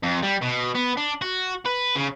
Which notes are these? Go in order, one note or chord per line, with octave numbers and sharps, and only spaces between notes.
F2
G3
B2
B3
D4
F#4
B4
C#3